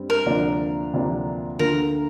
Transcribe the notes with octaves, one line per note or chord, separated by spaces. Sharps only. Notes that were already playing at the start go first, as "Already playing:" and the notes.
Already playing: G2 G3 C4
A#4
D2 C3 F3 A#3 D4
D2 C3 F3 A#3 D4
D2 D3 A#3 F4 A#4